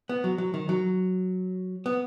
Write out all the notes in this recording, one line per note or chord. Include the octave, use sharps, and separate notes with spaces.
B3
F#3
F#3
D#3
F#3
B3